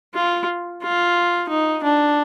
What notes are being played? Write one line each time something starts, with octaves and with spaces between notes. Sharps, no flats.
F4
F4
D#4
D4